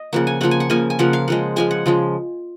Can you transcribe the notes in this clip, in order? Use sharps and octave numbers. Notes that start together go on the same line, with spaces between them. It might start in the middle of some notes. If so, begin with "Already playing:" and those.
Already playing: D#5
C#3 F3 A#3 F#5
G#5
C#3 F3 A#3 F#5
G#5
F#5
C#3 F3 A#3 G#5
G#5
C#3 F3 A#3 F#5
F5
C#3 F3 G#3 F#5
C#3 F3 G#3 G#5
F#5
C#3 F3 G#3